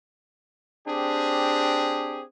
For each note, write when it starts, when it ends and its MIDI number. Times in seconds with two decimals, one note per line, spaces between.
0.88 2.23 60
0.88 2.23 62
0.88 2.23 67
0.88 2.23 68